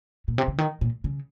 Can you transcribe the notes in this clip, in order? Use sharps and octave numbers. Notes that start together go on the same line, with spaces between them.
A#2
C3
C#3
D#3
A#2
C#3